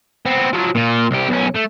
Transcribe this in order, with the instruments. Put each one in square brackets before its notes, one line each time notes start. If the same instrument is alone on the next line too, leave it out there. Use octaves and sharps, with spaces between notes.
[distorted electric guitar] B3 C4
F3 F#3
A#2 F4
C2 G4
B1 C#4
A3